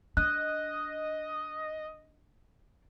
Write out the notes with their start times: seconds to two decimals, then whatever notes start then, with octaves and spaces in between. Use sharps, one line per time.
0.17 D4 D#5 F#6